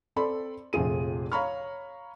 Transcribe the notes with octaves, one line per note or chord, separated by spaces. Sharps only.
C4 A4 D5 B5 C6
F1 A#1 F2 F4 G#4 D#7
C#5 F5 A#5 B5 C#6 F6